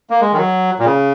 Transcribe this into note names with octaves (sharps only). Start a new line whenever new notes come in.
A#3
G#3
D#3
F#3
A#2
C#3